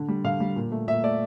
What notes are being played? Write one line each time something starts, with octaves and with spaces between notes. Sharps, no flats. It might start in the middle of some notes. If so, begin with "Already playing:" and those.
Already playing: D3
G3
D3 F5
G3
A#2
A3
A#2 E5
A3 D5